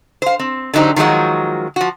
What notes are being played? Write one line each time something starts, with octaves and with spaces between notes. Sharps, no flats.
C5 F5
C4
D3 F#3 D#4 G4 C5
D#3 F3 F#3 G#3 F#4
F3 F#4